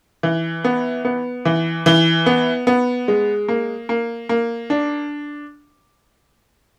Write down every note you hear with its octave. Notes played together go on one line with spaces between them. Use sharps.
E3
B3
B3
E3
E3
B3
B3
G#3
A#3
A#3
A#3
D4